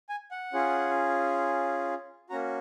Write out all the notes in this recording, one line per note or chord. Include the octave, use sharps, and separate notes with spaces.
G#5
F#5
C#4 F4 G#4
A#3 C#4 F#4 A#5